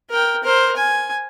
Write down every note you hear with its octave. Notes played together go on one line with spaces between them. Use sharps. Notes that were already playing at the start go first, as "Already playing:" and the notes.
A#4 G5
A#4 C5
G#5